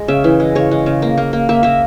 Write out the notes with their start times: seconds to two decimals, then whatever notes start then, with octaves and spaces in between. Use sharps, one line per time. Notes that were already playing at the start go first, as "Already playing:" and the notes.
Already playing: G#3
0.08 C#3 E5
0.24 E3
0.40 G#3
0.55 C#3 C#5
0.71 G#3
0.86 C#3
1.02 A#3
1.18 A#3
1.33 A#3
1.49 A#3 E5
1.63 A#3 E5